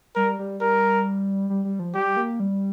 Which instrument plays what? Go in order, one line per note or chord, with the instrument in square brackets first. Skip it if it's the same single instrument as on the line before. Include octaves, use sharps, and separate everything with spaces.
[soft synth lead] G3 [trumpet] A#4
[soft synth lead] G3
[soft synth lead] G3 [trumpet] A#4
[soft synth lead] G3
G3
F3
[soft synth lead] G3 [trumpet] G4
[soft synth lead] A#3
G3